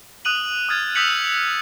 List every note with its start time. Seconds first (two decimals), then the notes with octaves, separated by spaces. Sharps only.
0.25 D#6 F#6 D#7 F#7
0.69 D#6 F6 G#6 A6
0.95 D#6 E6 G6 B6 C#7 F#7